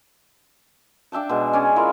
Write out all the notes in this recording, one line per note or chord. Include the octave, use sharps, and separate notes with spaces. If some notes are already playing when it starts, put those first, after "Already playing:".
D4 E5 G5 A5
B2 G#3
C#4 D5 G#5
E4 F4 A#4